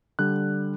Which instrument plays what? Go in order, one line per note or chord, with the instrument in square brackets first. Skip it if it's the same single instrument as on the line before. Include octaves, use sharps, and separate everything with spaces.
[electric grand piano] D3 G3 F#6